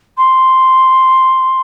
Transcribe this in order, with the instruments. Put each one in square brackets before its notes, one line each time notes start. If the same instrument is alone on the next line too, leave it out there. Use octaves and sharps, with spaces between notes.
[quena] C6